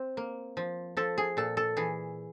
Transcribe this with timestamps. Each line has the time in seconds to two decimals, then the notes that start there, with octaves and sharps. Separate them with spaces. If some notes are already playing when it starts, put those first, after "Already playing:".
Already playing: C4
0.17 A#3
0.57 F3
0.97 F3 A4
1.18 G#4
1.37 A#2 A4
1.57 A4
1.77 E3 G#4